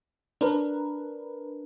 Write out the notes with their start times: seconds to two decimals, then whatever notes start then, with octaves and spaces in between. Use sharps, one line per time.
0.41 D4 A#4 B4